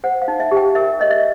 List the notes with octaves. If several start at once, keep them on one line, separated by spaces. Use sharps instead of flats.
C5 F#5
F5
D#4
E5
G4
G5
A#4 E5
C#5 D#5
E5